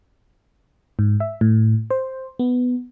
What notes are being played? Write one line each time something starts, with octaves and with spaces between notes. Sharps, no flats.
G#2
E5
A2
C5
B3